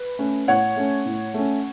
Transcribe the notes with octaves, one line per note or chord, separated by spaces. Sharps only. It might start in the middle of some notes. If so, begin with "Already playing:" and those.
Already playing: B4
A3 C#4
A2 C#5 F#5
A3 C#4
A2
A3 C#4